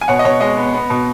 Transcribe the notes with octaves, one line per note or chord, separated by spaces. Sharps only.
G#5
B2 C#5 F#5
D#5
B2 C#5
G#3 D#5
B3
B3
B2